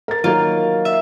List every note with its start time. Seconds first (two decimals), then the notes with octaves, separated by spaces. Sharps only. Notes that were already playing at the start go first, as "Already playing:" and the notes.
0.08 A#4 A6
0.24 D#3 F#3 A#3 F4 A#4
0.85 E5